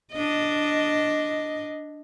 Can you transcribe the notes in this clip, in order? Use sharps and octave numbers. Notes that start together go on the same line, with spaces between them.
D4 D#5